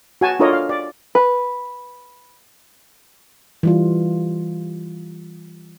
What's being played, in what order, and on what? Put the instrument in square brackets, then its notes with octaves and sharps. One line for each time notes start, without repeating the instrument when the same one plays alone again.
[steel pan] F#4 G#5 A5
D4 F4 A4 A#4 C#5 D#5
F5
D5
[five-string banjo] B4
[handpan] E3 G3 F4